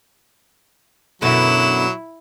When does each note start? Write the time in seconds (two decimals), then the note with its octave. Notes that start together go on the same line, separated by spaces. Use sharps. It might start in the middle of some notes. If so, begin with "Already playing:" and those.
1.22 F#2 B2 D3 F#3 E4 E7